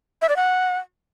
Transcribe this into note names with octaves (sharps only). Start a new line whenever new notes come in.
E5
D5
F#5